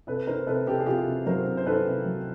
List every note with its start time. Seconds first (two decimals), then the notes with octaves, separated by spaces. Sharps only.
0.07 C3 A4 B4
0.27 D#3 A#4 C5
0.47 C3 A4 B4
0.67 C3 G4 A4
0.80 G#4
0.86 C3 F4 G4
1.07 C3
1.26 F#3 A#4 C5
1.47 C3
1.57 C5
1.67 D#3 A4 B4
1.85 C3
2.05 F#3